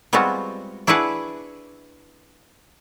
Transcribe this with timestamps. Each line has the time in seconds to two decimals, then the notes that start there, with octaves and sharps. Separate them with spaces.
0.13 G3 G#3 B3 C4 F4 F#4
0.87 D4 E4 F#4 G#4 B4 F#5